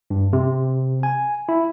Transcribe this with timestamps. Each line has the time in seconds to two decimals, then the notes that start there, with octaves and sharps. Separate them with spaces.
0.10 G2
0.33 C3
1.03 G#5
1.49 E4